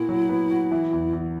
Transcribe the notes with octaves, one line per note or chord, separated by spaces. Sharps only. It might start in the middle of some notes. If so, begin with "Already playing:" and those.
Already playing: A#2 B3 E4 F#4
F#3
B3
F#4
E3
E2
E2